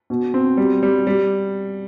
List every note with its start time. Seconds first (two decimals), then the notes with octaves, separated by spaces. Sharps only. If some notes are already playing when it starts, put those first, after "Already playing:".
0.10 B2
0.34 C4
0.57 G3
0.83 G3
1.07 G3